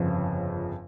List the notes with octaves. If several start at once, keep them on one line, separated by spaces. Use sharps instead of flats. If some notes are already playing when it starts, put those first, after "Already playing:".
Already playing: G1 F2 C#3 F3